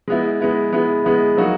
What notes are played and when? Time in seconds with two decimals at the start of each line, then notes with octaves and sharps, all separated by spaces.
0.08 G#3 B3 E4
0.40 G#3 B3 E4
0.73 G#3 B3 E4
1.05 G#3 B3 E4
1.37 F#3 A#3 D#4 F#4